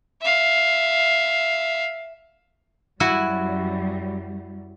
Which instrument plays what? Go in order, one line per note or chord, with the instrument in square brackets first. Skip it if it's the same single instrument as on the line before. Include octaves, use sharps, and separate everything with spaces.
[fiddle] E5 F5
[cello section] F#2 F#3 G3 [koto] E4 F#4 G#5